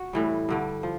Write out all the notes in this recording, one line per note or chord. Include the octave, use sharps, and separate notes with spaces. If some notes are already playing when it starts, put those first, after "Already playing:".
Already playing: F#4
A2 E3 G3
G2 D3 G3
F3